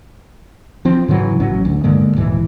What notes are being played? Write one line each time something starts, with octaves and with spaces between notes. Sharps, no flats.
F3 C4
G#2 C#3 E3 F#3
A1 F#3 C#4
D2
G2 D3 G#3 A#3
D#1 G#2 E3